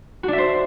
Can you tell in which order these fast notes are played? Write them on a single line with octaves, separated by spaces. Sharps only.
F#4 D4 E5 C5